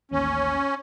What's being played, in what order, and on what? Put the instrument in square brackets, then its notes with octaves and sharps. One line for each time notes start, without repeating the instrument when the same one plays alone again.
[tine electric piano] A1 D#2 [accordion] C#4